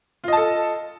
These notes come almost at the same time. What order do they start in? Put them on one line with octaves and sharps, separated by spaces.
F4 D#5 A5 A4